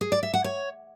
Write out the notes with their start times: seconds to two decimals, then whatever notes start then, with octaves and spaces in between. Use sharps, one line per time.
0.01 G#4
0.12 D5
0.23 E5
0.34 F#5
0.44 C#5